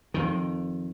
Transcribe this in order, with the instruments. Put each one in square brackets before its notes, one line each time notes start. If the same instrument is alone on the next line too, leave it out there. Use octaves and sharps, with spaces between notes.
[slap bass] F2 D#3